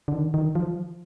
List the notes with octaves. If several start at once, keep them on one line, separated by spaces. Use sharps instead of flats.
D3
D#3
D#3
F3